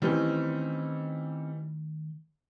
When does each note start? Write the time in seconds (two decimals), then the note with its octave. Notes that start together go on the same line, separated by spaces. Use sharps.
0.02 D#3 E3 G3 A3 C4 C#4 D#4 C6